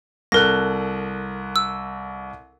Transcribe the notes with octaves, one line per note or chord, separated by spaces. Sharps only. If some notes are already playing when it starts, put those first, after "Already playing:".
C2 A4 A#4 F#6 A#6
E6